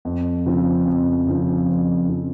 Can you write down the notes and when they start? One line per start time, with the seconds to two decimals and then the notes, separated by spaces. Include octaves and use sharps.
0.05 F2
0.46 C#3 F3 C4
0.86 F2
1.27 C#3 F3 C4
1.68 F2
2.09 C#3 F3 C4